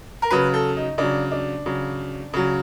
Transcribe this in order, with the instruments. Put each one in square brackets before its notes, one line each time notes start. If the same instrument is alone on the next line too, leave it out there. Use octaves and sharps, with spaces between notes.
[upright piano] A#4
C#3 F#3 B4
A4
D#4
C#3 F#3 D4
D4
C#3 F#3
C#3 F#3